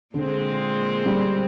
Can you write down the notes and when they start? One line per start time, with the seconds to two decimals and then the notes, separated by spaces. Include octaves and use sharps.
0.14 A#2 D3 G#3 C4
1.06 G3